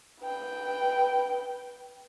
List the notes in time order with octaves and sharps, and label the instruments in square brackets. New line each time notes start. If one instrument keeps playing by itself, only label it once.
[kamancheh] B4 G5